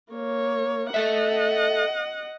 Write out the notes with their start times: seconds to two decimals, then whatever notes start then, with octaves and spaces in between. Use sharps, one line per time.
0.12 A#3 C#5
0.94 A4 D#5 E5 F#5